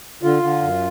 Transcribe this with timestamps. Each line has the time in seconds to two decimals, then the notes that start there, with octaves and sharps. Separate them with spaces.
0.23 D3 F4
0.42 D3
0.62 F#2